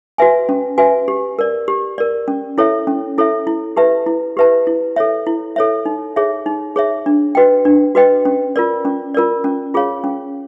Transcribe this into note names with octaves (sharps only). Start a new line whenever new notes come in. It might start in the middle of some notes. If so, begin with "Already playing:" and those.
F#4 B4 E5 G#5
C#4
F#4 B4 E5 G#5
G4
A#4 D5
G4
A#4 D5
C#4
E4 A4 C#5 E5
C#4
E4 A4 C#5 E5
E4
G4 B4 E5 A5
E4
G4 B4 E5 A5
E4
A4 C#5 E5
E4
A4 C#5 E5
D#4
G#4 C#5 E5
D#4
G#4 C#5 E5
D4
F#4 B4 D#5 G5
D4
F#4 B4 D#5 G5
C#4
F4 A#4 D5
C#4
F4 A#4 D5
C#4
F4 G#4 C#5 F5
C#4